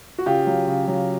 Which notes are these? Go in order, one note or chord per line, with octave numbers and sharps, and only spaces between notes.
F#4
C#3 F4 G4
F#3
C#3
F#3